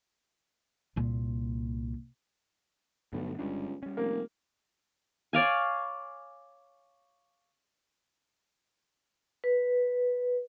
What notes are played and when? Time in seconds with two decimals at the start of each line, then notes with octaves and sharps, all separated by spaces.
0.96 C2 A#2
3.13 B1 G2 D3 A3
3.39 G1 C#2 G3 D4
3.83 G3 C#4
3.97 F1 A#3
5.33 C#5 D5 F5 G#5
9.44 B4